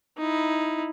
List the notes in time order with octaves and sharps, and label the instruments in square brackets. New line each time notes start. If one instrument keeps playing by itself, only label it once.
[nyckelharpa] D#4 E4